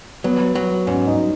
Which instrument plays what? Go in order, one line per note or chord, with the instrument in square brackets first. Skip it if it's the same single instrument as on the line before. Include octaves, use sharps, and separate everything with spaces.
[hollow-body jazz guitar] F#3 [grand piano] B3
[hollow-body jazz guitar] F#3
[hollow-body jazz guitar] G#2 [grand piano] C#4
[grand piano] D#4